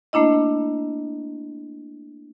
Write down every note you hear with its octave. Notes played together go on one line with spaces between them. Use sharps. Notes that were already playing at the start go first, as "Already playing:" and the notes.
A3 A#3 D4 E4 D#5